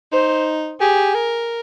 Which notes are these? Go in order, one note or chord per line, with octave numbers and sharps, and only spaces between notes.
D#4 C5
G4 G#4
A#4